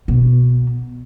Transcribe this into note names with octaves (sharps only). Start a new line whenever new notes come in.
B2